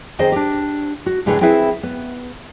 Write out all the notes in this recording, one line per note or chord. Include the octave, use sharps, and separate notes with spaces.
D#3 C4 G#4 C5 D#5
D4 G4
F#4
A2 D3 G3 G#4 A4 B4
C4 E4 G#4 B4 E5
B3